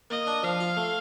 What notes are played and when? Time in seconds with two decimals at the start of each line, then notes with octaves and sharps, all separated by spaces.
0.10 A#3 D#5
0.27 D4
0.43 F3 F5
0.60 F4
0.77 A3